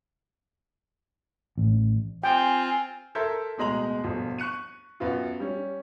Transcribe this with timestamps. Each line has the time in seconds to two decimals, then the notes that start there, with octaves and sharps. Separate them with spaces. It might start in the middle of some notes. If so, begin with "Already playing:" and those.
1.58 A1
2.24 C4 F4 G5 G#5
3.15 A4 A#4 E5 C6 G6 G#6
3.58 D1 B2 G#3 D#5 A#5 F#7
4.04 G1 B2 F3
4.39 C#6 F#6 C#7 D#7
5.00 F#2 B3 F4
5.40 G3 C#4